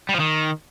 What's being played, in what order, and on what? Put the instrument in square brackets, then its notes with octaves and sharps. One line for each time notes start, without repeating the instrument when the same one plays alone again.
[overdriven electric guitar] G3
F3
D#3